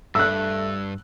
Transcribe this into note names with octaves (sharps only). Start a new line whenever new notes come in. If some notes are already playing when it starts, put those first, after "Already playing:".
G2 A3 E6 F#6